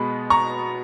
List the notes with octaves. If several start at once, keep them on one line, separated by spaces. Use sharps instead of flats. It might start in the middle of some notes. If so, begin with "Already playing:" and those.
Already playing: B2 G#3 B3 B5
A#5 C#6